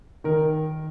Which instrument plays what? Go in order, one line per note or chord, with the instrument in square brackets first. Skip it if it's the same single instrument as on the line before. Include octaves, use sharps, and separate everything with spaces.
[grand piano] D#3 [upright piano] A#4